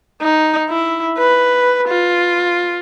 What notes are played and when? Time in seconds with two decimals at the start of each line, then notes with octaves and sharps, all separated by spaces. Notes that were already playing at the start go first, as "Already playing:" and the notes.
0.22 D#4
0.69 E4
1.18 B4
1.88 F4